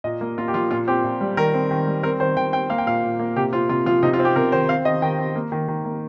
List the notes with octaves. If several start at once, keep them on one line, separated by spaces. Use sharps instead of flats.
A#2 D#5
A#3
A#2 F4
G4
F3 F4
A#2 F4
C4 G4
A#2
G3
D#3 A#4
C4
D#3
G3
C4 A#4
D#3 C5
D#3 G5
C4 G5
A#3 F5
G5
A#2 F5
A#2
A#3
C3 G4
C4 F4
C3 F4
F3 F4
C3 D#4
F4
C4
G4
C3 A#4
D#3 C5
C4 F5
D#3 D#5
D#3 G5
C4
A#3
D#3
D#3
A#3